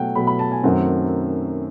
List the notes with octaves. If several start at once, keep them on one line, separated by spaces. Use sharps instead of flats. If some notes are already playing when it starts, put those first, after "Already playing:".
Already playing: B2 F#3 A3 F#5 G5
B2 F#3 A3 B5
B5
A5
G#5
F#2 D#3 F#3 A3 C4 F#5